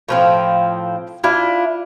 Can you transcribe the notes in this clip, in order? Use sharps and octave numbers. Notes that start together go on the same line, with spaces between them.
A2 F3 C4
D4 E4 F4